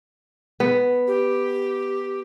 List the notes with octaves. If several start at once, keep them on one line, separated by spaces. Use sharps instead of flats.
B3
G4